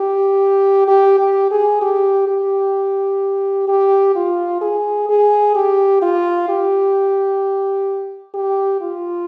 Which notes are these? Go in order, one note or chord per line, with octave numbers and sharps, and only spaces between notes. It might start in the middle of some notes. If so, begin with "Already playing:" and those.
Already playing: G4
G4
G4
G#4
G4
G4
G4
F4
G#4
G#4
G4
F4
G4
G4
F4